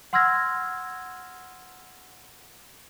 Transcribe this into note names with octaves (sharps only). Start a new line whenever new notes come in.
F#5 C6 E6 F6 G#6 A#6